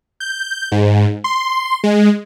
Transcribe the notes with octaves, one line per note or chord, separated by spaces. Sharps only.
G6
G#2
C6
G#3